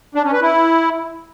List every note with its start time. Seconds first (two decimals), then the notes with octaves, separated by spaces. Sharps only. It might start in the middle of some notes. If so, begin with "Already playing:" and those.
0.15 D4
0.24 C#4
0.33 B4
0.41 E4